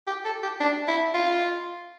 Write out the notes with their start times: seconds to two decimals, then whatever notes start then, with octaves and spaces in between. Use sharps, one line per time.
0.07 G4
0.25 A4
0.43 G4
0.60 D4
0.88 E4
1.14 F4